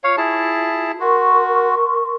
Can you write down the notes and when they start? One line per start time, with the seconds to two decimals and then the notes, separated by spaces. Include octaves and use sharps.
0.04 F4 C#5 F5
0.17 E4 G#4 A5
1.00 F#4 A#4 C6 C#6